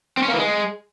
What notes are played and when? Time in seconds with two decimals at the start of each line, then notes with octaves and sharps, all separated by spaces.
0.17 C4
0.23 C#4
0.28 A#3
0.33 E3
0.39 G#3